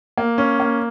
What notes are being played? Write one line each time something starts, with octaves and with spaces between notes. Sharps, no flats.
A#3
C#4
A#3